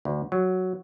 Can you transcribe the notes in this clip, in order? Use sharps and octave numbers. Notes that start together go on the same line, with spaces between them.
D2
F#3